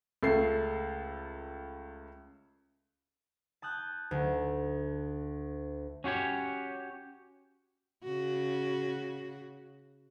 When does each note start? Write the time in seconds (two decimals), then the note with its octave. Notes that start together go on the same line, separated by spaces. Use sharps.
0.23 C#2 A3 A4 C7
3.62 A5 D#6 F#6 G6
4.11 D2
6.04 C#4 F#4 G4 C#5
8.04 C#3 F#4